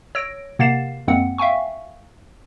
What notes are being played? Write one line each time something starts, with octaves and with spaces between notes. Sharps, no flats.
C#5 E6 A#6 D7
C3 A#3 F#5 A6 C7 E7
F#2 G#3 A#3 C4 F#5 C#7
E5 F5 G5 G#5 C#6